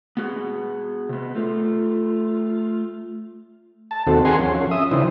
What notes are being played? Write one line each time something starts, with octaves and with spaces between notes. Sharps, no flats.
B3 F#4 G#4
C3 B3
A3 F4
A5
D#2 C4 F#4 A4
G#4 A#4 F#5 G#5 C6
F3 C#4
E5 D#6
C#3 E3 F3 D4 E4 C5